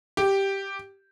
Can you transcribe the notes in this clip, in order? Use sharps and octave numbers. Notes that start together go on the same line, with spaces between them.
G4